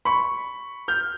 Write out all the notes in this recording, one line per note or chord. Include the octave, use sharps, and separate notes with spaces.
B5 C#6
F6 G6